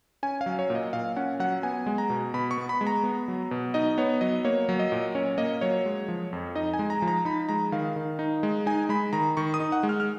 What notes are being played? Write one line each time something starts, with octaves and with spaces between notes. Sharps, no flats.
C#4 G#5
F5
F#3
C#5
A#2
D#5
A#2 F5
C#4 F#5
F#3 F#5
B3 G#5
G#3
A#5
B2
B2 B5
C#6
B3
B5
G#3
A#5
B3
F#3
B2
D#4 D#5
B3 C#5
F#3 D#5
A#3 C#5
F#3
D#5
A#2
C#4 C#5
A#3 D#5
F#3 C#5
G#3
F3
F2
D#4 D#5
G#5
G#3
A#5
F3
A#5
D#4 B5
G#3 A#5
D#3 F5
D#3
D#4
G#3
D#4 G#5
G#3 B5
D#3 A#5
D#3 C#6
D#6
D#4
F#5
G#3
F6
F6